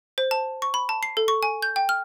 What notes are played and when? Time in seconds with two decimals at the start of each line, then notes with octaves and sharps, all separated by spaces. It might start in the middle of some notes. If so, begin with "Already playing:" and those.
0.18 C5
0.31 A5
0.62 C#6
0.74 B5
0.89 A5
1.03 C7
1.17 A4
1.28 C#6
1.43 G#5
1.62 G6
1.76 G5
1.89 F6